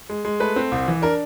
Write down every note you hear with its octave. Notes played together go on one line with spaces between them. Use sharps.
G#3
G#3
A3 B4
C4
C2
E3
D4 A#4